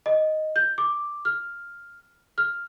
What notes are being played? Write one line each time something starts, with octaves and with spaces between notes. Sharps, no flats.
D#5
G6
D6
F6
F6